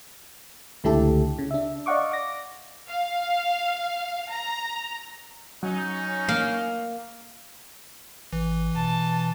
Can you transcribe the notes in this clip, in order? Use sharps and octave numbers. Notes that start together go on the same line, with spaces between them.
C#2 D3 A3 E4 G4 A4
C#3
D4 E5
D5 D#5 F5 F#5 C#6 D6
D6 A#6
F5
A#5
F#3 C#4 D#4
A#3 F5
A1 E3
B2 A5